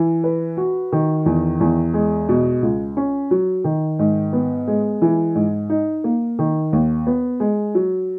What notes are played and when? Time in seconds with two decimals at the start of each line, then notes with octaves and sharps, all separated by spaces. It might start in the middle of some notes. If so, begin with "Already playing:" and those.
Already playing: E3
0.24 B4
0.57 F#4
0.92 D#3
1.26 E2
1.60 E2
1.94 G#3
2.29 B2
2.62 C#2
2.97 C#4
3.31 F#3
3.64 D#3
3.99 G#2
4.33 B3
4.68 G#3
5.02 E3
5.35 G#2
5.70 D#4
6.04 A#3
6.39 D#3
6.73 D#2
7.07 B3
7.40 G#3
7.75 F#3